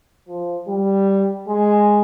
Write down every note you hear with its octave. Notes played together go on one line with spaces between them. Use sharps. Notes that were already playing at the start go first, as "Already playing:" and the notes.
F3
G3
G#3